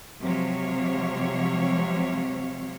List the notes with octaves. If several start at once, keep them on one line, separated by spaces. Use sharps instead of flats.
C3 F3 F#3 G#3 C#5 F5